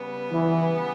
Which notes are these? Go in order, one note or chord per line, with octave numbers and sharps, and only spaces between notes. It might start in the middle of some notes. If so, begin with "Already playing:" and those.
Already playing: C#3 G3 B3
E3